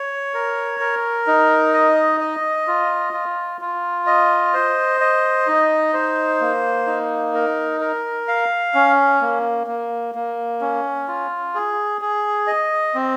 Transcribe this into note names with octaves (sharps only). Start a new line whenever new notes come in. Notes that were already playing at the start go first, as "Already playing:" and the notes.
Already playing: C#5
A#4
A#4
D#4
D#5
D#5
F4
F4
F4
D#5
C5
D#5
D#4
C5
A#3
D#4
A#4
A#4
F5
C#4
A#3
A#3
A#3
C#4
F4
G#4
G#4
D#5
C4